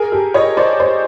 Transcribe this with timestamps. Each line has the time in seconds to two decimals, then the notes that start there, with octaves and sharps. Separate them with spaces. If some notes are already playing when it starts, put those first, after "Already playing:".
Already playing: G#4 A#4
0.12 G4 A4
0.34 C#5 D#5
0.57 C5 D5
0.80 C5 D5